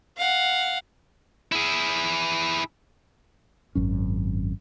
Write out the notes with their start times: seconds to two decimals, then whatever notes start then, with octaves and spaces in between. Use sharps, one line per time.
0.17 F5 F#5
1.52 E4 G#4
3.75 G#1 F#2 C#4